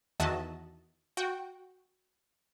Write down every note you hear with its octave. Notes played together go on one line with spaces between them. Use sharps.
E2 D#3 F#4 D#5 E5 A5
F#4 G5